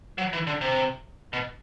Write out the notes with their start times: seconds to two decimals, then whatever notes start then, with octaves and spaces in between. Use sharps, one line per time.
0.18 F#3
0.33 E3
0.47 D3
0.61 C3
1.33 B2